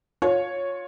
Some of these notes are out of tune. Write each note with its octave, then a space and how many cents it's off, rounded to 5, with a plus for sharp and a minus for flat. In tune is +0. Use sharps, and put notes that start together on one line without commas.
F4 +25 C#5 -5